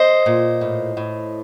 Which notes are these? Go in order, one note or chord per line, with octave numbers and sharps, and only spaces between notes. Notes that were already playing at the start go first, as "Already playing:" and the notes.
Already playing: C5 D#5
A#2
A2
A2